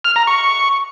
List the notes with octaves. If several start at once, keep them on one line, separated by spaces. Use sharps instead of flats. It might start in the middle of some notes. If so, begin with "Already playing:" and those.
F6
A#5
C#6